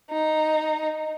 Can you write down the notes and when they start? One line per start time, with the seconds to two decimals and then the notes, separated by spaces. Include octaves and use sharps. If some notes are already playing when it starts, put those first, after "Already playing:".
0.10 D#4